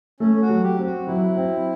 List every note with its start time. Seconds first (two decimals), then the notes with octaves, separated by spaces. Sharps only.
0.20 A3 C#4
0.42 F#4
0.49 F#3
0.63 G4
0.78 C4
0.86 F#4
1.07 F#3 E4
1.36 C4